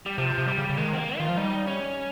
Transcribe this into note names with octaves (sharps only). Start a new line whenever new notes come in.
G3
C3 F3
C3
G3
C#3
C#3
D#3 G#3
C4
A#3
D#3 F4
F3
G3 D#4
C#4